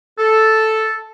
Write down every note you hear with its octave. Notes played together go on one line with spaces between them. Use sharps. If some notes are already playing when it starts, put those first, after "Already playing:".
A4